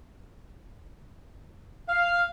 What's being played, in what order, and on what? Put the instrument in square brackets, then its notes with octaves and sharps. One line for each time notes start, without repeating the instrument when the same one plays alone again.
[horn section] F5